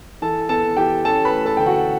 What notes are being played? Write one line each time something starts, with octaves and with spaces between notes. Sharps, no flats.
E3 A4 A5
B3 A4 A5
E3 G4 G5
C#4 A4 A5
B4 B5
A3
A4 A5
D3 G5
F#4 F#5